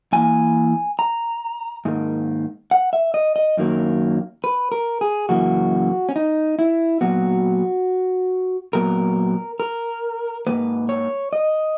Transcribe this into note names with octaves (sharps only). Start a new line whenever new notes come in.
G#2 E3 A#3 G#5
A#5
G#2 D#3 A#3
F#5
E5
D#5
D#5
F#2 D#3 F#3 A#3
B4
A#4
G#4
F#2 C#3 E3 A#3 F#4
C#4
D#4
E4
A#2 F#3 B3 F#4
A#2 F#3 B3 A#4
A#4
G#2 D#3 A#3 B4
C#5
D#5